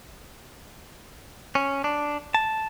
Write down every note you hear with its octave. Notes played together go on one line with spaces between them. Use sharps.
C#4
D4
A5